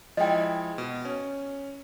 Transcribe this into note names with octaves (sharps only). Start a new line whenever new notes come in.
F3 G#3 E4 D#5 G5
B2
C#4